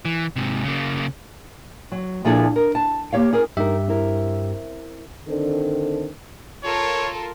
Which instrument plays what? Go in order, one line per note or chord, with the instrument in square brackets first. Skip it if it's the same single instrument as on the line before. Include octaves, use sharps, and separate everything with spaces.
[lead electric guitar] E3
G#2 C3
C#3 A#3
[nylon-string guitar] F#3
A#2 F3 D4 E4 G#4 A4
A#4
A5
A#3 G4 C#5 F5
C#4 G#4 A#4
[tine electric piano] G2 G4 E5 [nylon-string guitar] D#4 A#4
[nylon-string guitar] C4 E4 A#4
[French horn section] D3 D#3 C4 D4 A4
[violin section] F4 A4 A#4 [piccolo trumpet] C#5